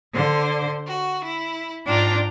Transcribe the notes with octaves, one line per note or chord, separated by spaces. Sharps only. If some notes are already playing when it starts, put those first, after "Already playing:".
D3 C5
F#4
E4
G#2 D4 F4 G5 A#5